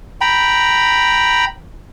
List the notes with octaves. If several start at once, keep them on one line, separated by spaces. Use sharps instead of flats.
G5 A#5 B5